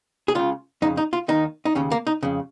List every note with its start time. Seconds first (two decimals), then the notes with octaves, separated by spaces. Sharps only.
0.28 G#4
0.35 C#2 C#3 F4
0.82 F2 C#3 D#4
0.97 D#4
1.13 F4
1.28 D#2 D#3 D#4
1.65 D#4
1.75 D#2 C#3 C#4
1.91 A#3
2.07 D#4
2.23 F2 C#3